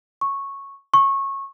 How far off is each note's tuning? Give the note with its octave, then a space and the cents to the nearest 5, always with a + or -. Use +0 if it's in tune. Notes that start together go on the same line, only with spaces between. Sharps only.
C#6 -5
C#6 -20